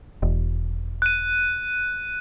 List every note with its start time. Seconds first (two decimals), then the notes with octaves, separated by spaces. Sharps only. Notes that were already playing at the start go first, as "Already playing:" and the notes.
0.22 E1
1.02 F#6 D#7